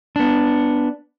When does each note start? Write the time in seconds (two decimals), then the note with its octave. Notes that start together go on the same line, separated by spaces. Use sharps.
0.16 B3 D4